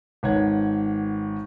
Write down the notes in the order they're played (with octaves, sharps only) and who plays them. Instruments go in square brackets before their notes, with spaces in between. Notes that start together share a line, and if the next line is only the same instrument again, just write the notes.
[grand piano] G#1 B4 C#5 F#5 G#6